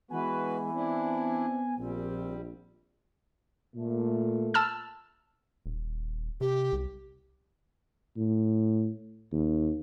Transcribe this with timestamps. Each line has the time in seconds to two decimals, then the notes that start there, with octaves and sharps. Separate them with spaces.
0.11 E3 G#3 B3 F#4 B4 G#5
0.74 C4 D4 E4
1.79 A#1 A#2 G3 C4
3.76 A#2 A3
4.54 A5 E6 F6
5.66 D#1
6.41 C3 G4
6.73 C2
8.17 A2
9.32 D#2